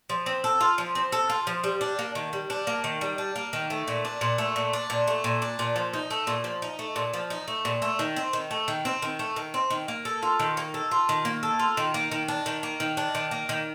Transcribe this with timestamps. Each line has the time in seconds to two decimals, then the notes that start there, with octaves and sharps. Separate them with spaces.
0.10 F3
0.26 C4
0.44 A4
0.61 F4
0.78 F3
0.95 C4
1.12 A4
1.30 F4
1.47 F3
1.64 G3
1.81 D4
1.99 A#3
2.15 D#3
2.33 G3
2.50 D4
2.67 A#3
2.84 D#3
3.01 G3
3.18 D4
3.36 A#3
3.53 D#3
3.70 A3
3.88 A#2
4.05 D4
4.21 A#2
4.38 A3
4.56 A#2
4.73 D4
4.90 A#2
5.08 A3
5.24 A#2
5.42 D4
5.59 A#2
5.76 F3
5.94 D#4
6.11 A3
6.27 A#2
6.44 F3
6.62 D#4
6.79 A3
6.96 A#2
7.13 F3
7.30 D#4
7.48 A3
7.65 A#2
7.82 A3
7.99 D#3
8.16 C4
8.33 D#3
8.51 A3
8.68 D#3
8.85 C4
9.02 D#3
9.19 A3
9.36 D#3
9.54 C4
9.70 D#3
9.88 A#3
10.05 A4
10.23 F4
10.39 D#3
10.57 A#3
10.74 A4
10.91 F4
11.09 D#3
11.25 A#3
11.43 A4
11.59 F4
11.77 D#3
11.94 A#3
12.12 D#3
12.28 D4
12.46 D#3
12.63 A#3
12.80 D#3
12.97 D4
13.15 D#3
13.31 A#3
13.49 D#3